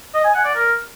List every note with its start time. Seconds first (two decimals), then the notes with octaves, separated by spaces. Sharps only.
0.14 D#5
0.24 G#5
0.35 F#5
0.45 D5
0.55 A#4